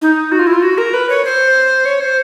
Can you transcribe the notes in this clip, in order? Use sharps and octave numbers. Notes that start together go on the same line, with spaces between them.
D#4
F#4
F4
E4
F4
F#4
A#4
B4
C#5
C5
C#5
C5